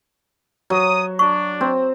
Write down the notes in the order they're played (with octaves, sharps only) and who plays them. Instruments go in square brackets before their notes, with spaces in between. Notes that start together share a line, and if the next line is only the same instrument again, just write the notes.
[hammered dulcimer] F#3 [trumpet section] D#6
[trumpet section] D4 [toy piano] C#6
[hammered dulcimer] C4